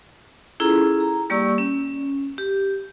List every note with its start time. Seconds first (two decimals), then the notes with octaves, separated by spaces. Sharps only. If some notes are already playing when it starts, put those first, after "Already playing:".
0.60 C#4 E4 F4 G#4 A4 A#5
1.00 A#5
1.30 G3 A#3 G4 D5 C#6 E6
1.58 C#4
2.38 G4